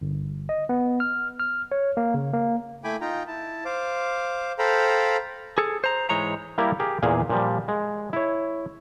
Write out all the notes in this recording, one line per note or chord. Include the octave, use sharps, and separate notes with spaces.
G1
D#5
B3
F6
F6
C#5
A#3
C#3
A#3
A3 E4 G5 G#5 B5 D6
D#4 F4 G5 A#5
E4 A5
C5 F5 D6
A4 C5 F5 G5 A#5 B5
G#4 A4
C5 A#5
G#2 E3 G#3 C#5 A#5
G3 A#3 E4 G4 A#4
G4 G#4 A#4
E2 A#2 G#4 F5
A#2 F3 G3
G#3
E4 C#5